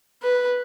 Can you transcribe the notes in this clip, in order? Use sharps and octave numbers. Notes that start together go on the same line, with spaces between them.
B4